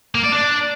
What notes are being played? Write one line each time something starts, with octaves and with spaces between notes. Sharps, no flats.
A#3
D5
D4